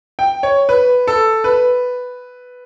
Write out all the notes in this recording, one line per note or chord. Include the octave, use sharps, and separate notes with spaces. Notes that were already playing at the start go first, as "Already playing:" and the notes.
G5
C#5
B4
A4
B4